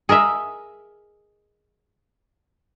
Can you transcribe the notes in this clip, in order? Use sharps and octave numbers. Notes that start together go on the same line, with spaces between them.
G#4 A#4 D#5 E5